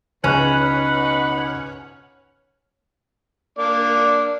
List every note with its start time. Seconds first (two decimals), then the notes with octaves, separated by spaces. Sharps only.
0.24 C#2 B2 C#4 D#4 B4 F#5 C#6 F#6
3.59 A#3 D4 D5